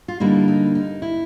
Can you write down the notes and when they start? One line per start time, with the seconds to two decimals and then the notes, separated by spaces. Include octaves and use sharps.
0.08 F4
0.20 D3 G3 A#3 D#4 E4
0.48 D#4
0.75 D#4
1.02 E4